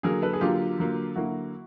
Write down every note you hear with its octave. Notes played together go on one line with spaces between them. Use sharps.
D3 F#3 A#3 G#4 A#4
A4 B4
G#4
D3 F#3 A#3 F4 G4
D3 F#3 A#3
D3 F#3 A#3 E4 F#4